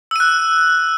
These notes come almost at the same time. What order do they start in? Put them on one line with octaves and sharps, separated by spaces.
E6 D#7 F#6